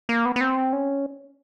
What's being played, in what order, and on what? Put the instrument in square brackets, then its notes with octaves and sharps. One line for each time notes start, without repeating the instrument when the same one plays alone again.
[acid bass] A#3
B3
B3
C4
C#4